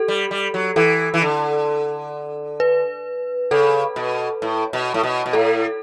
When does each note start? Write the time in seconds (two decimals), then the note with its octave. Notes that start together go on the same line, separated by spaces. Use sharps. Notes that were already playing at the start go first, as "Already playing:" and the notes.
Already playing: G4 A4
0.08 G3
0.31 G3
0.54 F#3
0.76 E3 A4
1.14 E3
1.22 D3
2.60 B4
3.51 C#3 A4
3.96 B2
4.42 A2
4.73 B2
4.94 A2
5.03 B2
5.26 B2
5.33 A2 A4